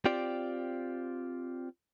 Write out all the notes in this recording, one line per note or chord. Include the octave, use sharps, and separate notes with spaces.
C4 F4 G4 D5